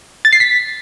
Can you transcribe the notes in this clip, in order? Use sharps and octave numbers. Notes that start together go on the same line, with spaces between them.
A6
C7
B6